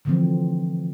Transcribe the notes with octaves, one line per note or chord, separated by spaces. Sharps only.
D3 E3 F3 A3 C4